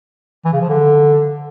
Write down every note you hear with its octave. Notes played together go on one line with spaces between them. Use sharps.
E3
C#3
F3
D3